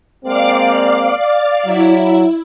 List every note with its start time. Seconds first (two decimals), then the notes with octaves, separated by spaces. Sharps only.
0.23 G#3 A#3 C4 D5 F5 D6
1.65 F#3 E4